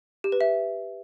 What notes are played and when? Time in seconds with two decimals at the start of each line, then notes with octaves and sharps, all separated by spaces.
0.24 G4
0.32 B4
0.41 E5